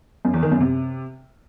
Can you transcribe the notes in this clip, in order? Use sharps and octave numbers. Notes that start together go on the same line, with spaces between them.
F#2
E2
D#3
F#2
C3